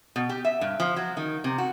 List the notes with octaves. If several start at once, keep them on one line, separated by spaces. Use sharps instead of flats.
B2
G4
E5
G2
F3
F#3
D#3
C3
F#4